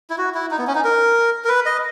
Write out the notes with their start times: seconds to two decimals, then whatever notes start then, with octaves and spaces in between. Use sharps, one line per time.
0.10 E4
0.18 F#4
0.34 E4
0.51 D#4
0.59 B3
0.67 C#4
0.75 D#4
0.84 A#4
1.44 A#4
1.49 B4
1.66 D#5